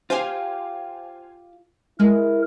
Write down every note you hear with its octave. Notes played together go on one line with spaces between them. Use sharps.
F4 G4 C5 F5 G#5
G#3 E4 A#4